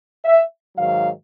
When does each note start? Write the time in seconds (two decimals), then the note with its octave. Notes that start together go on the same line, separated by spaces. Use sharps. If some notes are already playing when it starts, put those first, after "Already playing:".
0.25 E5
0.75 G#2 D#3 F#3 F5